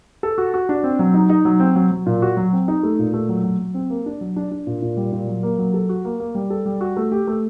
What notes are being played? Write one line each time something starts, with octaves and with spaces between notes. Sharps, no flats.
A4
F#4
F#4
D4
C4
F#3
D#4
D#4
F#3
C4
F#3
F#3
A#2
F#4
F#3
C4
D#4
A3
A#2
A3
F#3
F#3
F#3
C4
A#3
D4
F#3
D4
D4
A#2
A#2
G3
A#2
F#3
A#3
F#3
A4
F#4
A#3
A#3
G3
A4
G3
F#4
A3
G4
A3